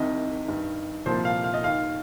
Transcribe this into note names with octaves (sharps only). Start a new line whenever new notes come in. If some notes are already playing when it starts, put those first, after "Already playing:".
Already playing: C2 C3 D#3 D#5
G2 D#3
C2 A#2 F3 C5
F5
F5
D#5
D#2 D#3 F5